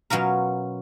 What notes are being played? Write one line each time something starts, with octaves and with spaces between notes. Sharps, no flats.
B2 F#3 C#4 F4 A#4